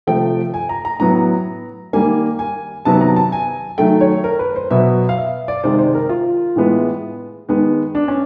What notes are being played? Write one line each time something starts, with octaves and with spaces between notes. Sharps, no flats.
C3 F3 A3 G5
G#5
A#5
A#5
A2 F#3 B3 A#5
D#3 G3 A#3 G#5
G#5
C3 D#3 F#3 B3 A5
A#5
A5
G#5
D#3 F#3 A3 G5
C#5
A#4
B4
C5
B2 F#3 B3 E5
F5
E5
D5
C3 D#3 G#3 C5
C5
A#4
F4
A2 E3 G#3 B3
D#3 G#3 B3
D4
C#4